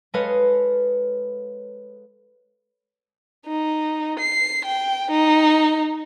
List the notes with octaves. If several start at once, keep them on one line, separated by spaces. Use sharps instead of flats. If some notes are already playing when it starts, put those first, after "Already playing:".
G#3 A4 B4 C#5 D#5 F5
D#4
C7
G5
D#4